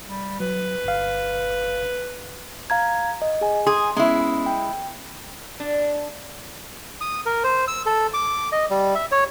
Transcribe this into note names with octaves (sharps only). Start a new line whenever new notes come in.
G3
F#3 B4
G1 F5
F5 A#5 G#6
D#5
G#4 G#5
G#4 C6
G#3 B3 C#4 E4
G5
D4
D#6
A#4
C5
E6
A4
D6
D#5
G3
E5
C#5